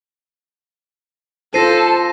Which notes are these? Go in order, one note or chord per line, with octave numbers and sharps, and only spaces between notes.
F4 A4 C5 A5 A#6 C7 D#7